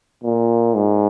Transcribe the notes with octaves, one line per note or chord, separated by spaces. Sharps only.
A#2
G#2